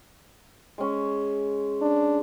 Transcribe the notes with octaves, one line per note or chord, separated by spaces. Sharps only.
G#3 C#4
D4